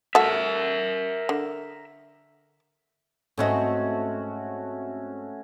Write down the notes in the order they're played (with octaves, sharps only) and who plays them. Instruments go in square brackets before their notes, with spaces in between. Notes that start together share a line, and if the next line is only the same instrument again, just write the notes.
[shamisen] A3 F#4 [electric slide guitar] A#4 E5
[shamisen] D3
[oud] G#2 C4 D#5 [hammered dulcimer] A3 C#4 F#4